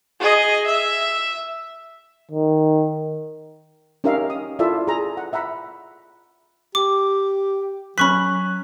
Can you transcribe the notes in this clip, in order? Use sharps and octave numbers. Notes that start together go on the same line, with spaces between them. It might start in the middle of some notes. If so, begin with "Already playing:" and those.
G#4 D#5
E5
D#3
C#4 D#4 G4 A#4 E5 F5
D#6
E4 F4 A4 D5 E5
G#4 A#5
F#5
E5 F#5 A#5 B5
G4 D6
F#3 C#4 B5 C#6 F#6 B6